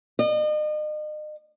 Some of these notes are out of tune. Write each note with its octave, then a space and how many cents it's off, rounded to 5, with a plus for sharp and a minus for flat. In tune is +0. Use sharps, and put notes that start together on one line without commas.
D#5 -40